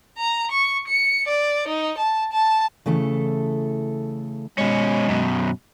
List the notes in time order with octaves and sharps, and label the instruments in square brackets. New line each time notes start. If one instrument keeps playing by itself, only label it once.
[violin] A#5
C#6
C#7
D5
D#4
A5
A5
[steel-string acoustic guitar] C#3 E3 A3 A4
[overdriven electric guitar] B2 C#4 [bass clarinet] G#3
[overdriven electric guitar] F#2 B2